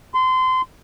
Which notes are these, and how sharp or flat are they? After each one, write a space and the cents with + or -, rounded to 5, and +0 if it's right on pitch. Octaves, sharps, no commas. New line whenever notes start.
C6 -25